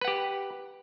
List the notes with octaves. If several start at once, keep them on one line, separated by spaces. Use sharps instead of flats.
G4 B4 F#5